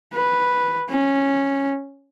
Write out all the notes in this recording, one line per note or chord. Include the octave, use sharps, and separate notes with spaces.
B4
C#4